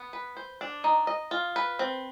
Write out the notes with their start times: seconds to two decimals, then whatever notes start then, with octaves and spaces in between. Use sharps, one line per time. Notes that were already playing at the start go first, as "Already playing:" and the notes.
Already playing: B3
0.13 B4
0.37 C5
0.61 D4
0.84 D#4
1.07 D#5
1.31 F4
1.56 B4
1.79 C4